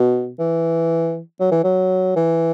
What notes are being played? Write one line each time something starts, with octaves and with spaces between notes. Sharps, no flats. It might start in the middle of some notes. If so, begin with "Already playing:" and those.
Already playing: B2
E3
F#3
E3
F#3
E3